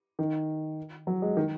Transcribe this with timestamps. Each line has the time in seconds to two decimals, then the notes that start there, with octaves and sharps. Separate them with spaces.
0.19 D#3
1.07 F#3
1.22 G#3
1.37 D#3